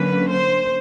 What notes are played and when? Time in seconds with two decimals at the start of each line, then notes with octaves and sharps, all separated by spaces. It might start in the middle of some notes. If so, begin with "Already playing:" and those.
Already playing: D3 F#3 A#3 C#4 B4
0.29 C5